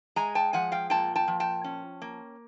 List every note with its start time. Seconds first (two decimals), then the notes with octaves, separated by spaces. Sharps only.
0.16 G#3 G#5 A#5
0.35 G5 A5
0.53 F3 F#5 G#5
0.72 F5 G5
0.90 A#2 G5 A5
1.16 G5 A5
1.28 F3
1.40 G5 A5
1.64 C#4
2.02 A#3